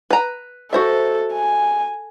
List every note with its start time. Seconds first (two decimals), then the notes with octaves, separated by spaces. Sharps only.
0.10 B4 A#5
0.73 F#4 A4 C5 E5
1.33 G#5